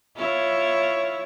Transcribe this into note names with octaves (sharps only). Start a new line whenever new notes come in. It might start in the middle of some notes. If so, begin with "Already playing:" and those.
E4 F4 C#5